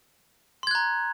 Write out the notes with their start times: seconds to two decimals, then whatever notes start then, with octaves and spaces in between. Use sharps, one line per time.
0.63 C6
0.67 G#6
0.71 F#6
0.75 A#5